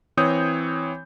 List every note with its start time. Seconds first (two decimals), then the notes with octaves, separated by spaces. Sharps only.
0.17 E3 C4 C#5 D#6 G6